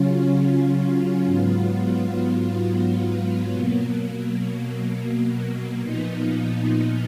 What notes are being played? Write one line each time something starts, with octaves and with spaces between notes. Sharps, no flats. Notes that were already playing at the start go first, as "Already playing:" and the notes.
Already playing: C#3 F#3 C#4 F4
G#2 F#3 B3 F4
B2 F#3 A#3
A#2 F3 B3 D#4